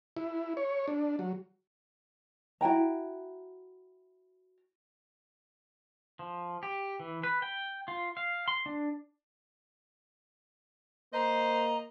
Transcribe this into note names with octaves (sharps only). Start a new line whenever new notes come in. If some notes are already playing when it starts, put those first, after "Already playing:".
E4
C#5
D4
F#3
E4 F#4 G5 A#5
F3
G4
E3
B4
G5
F4
F5
C6
D4
A#3 C5 D#5 A#5